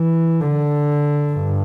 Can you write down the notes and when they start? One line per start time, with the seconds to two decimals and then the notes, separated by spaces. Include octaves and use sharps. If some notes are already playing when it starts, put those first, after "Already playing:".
Already playing: E3
0.40 D3
1.33 G2